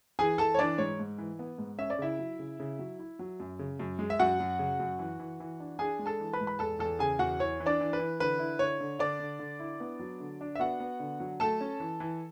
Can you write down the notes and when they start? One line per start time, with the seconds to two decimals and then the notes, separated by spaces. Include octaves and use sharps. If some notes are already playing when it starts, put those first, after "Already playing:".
0.19 E3 G#4 G#5
0.38 E3 A4 A5
0.54 C#5
0.59 E3 D4 D5
0.78 G#2 C#5
0.99 G#2
1.18 E3
1.39 B3
1.58 G#2
1.78 C#4 E5
1.90 D5
1.98 C#3 E4 E5
2.19 F#3
2.39 C#3
2.60 C#3
2.79 F#3
2.99 E4
3.19 F#3
3.40 F#2
3.59 C#3
3.80 F#2
3.99 G#3
4.10 E5
4.19 F#2 F#4 F#5
4.40 F#2
4.59 C#3
4.80 F#2
4.99 E3
5.19 E3
5.40 E3
5.60 D4
5.79 D4 G#4 G#5
5.99 G#3
6.06 A4 A5
6.20 E3
6.33 B4 B5
6.40 G#2
6.47 B5
6.59 E2 A4 A5
6.79 E2 A4 A5
6.99 C#3 G#4 G#5
7.19 E2 F#4 F#5
7.39 E3 C#5
7.60 E3
7.66 D4 D5
7.80 E3
7.93 B4
7.99 E3
8.20 D3 B4
8.39 E4
8.59 D3 C#5
8.80 D3
8.99 D3 D4 D5
9.20 D3
9.39 D3
9.59 E4
9.80 B3
10.00 F#3
10.20 D3
10.41 D4
10.55 E5
10.60 B3 F#4 F#5
10.80 B3
11.00 D3
11.20 F#3
11.40 A3 A4 A5
11.61 C#4
11.80 E3
12.00 E3